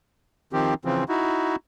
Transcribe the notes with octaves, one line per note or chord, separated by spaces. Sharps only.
D#3 F3 C4 G4
C#3 E3 F3 C4
D#4 E4 F#4